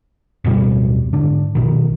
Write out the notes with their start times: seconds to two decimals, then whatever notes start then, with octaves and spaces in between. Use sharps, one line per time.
0.44 D1 F2 B2 G3
1.13 G#2 D3 D4
1.55 A#1 B2 D#3